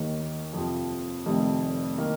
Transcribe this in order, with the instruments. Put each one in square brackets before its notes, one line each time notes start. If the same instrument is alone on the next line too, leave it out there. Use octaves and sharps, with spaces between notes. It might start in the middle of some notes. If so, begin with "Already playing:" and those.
Already playing: [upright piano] D#2 D#3 A#3
F2 C3 F3
F1 F2 C3 D#3
D#3 A#3